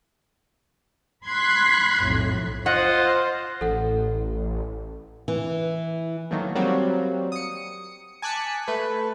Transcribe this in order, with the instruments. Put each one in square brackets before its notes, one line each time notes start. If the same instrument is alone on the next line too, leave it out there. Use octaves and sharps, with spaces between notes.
[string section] B5 C6 F#6 G#6 B6
B1 F2 A2
[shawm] F4 [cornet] C5 [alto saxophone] D#5 [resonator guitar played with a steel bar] F#5
[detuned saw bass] A1 [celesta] A4 F#5
[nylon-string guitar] E3
[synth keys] D#3 F#3 A3 A#3
F#3 G3 A#3 C4 F#4
D#6 C#7
G#5 A5 D6 F#6 B6 C#7
A3 B4